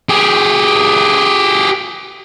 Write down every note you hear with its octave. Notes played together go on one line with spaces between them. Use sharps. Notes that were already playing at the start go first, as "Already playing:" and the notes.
G4 G#4